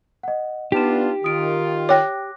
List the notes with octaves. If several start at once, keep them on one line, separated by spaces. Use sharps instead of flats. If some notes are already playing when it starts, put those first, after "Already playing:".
D#5 F#5
B3 D4 D#4 F4 G4 E7
D#3 F4 D#6 D7
C#5 G5 D6 F#6 A#6